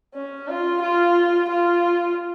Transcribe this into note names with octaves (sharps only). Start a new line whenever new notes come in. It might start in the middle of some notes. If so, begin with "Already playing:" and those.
C#4
F4
F4
F4